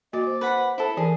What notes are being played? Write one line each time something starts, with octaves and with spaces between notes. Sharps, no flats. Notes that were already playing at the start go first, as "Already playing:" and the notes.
A#3 F#4 D5 D#5
C5
B4 F#5 B5
E4 A4
E3 G#4 A#4